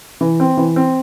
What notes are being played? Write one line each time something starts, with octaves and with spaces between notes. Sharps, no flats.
E3
C4
E3
C4